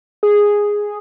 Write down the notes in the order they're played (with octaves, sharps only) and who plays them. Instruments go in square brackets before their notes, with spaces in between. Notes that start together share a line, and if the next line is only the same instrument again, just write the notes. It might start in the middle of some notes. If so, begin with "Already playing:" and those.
[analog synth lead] G#4